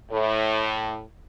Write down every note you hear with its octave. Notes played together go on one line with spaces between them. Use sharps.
A2